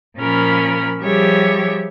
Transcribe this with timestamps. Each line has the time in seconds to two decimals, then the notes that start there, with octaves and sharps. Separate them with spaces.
0.18 A#2 F3 C#4 A#4 B5 F6
1.02 F3 G3 G4 G#4 C#5 E5